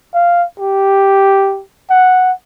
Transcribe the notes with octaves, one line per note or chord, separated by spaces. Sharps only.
F5
G4
F#5